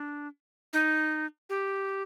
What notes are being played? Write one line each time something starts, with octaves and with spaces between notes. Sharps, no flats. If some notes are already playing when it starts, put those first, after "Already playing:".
Already playing: D4
D#4
G4